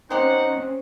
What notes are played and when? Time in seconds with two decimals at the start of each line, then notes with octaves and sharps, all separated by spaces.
0.10 C4 C#4 D#4 G4 C5 F#5